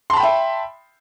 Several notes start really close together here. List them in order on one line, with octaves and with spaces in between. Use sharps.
C6 A5 B5 G5 E5